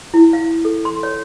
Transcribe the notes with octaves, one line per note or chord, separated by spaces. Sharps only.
E4
F5
A4
C6
C#5